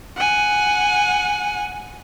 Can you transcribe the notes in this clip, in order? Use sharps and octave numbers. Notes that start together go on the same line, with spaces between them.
F#5 G#5